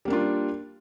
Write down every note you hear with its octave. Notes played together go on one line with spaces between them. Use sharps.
G3 A#3 D4 F4